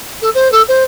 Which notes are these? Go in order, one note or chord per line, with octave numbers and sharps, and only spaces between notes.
A4
C5
A4
C5